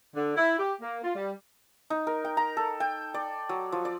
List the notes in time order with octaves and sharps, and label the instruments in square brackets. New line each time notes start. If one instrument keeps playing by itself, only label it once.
[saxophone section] D3
E4
G4
A#3
F4
G3
[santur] D#4
A#4
G5
A#5
A4
G5
D5
F#3
F3
D5